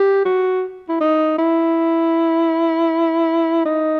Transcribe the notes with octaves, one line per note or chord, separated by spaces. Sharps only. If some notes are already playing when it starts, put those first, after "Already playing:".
Already playing: G4
F#4
E4
D#4
E4
D#4